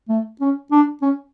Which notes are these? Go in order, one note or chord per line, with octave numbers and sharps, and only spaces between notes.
A3
C#4
D4
C#4